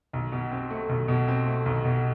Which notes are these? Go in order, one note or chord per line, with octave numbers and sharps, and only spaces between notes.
B1
B2
C4
A3
B1
B2
C4
A3
B1
B2